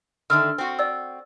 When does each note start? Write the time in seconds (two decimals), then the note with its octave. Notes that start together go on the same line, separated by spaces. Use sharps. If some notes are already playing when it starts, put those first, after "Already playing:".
0.30 D3 D#3 A3 E6 F6
0.58 C4 F#4
0.79 D5 E6